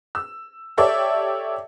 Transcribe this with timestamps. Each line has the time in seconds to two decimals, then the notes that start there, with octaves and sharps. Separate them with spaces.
0.15 E6
0.77 G4 A4 C#5 D5 E5